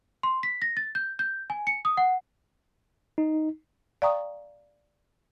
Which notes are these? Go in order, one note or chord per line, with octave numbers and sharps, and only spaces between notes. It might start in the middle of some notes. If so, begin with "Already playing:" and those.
C6
B6
A#6
A6
G6
G6
G#5
C#7
D#6
F#5
D#4
D5 F5 G5 A#5 C#6 D#6